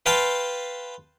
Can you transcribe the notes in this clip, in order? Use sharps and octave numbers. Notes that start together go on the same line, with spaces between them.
B4 F5 G5 A5 C6